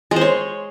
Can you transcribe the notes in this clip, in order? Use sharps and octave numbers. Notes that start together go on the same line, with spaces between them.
G#3
C5
C#5